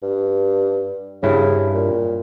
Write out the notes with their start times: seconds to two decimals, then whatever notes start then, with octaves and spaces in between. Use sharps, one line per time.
0.03 G2
1.23 G2 C#3 E4
1.74 A#2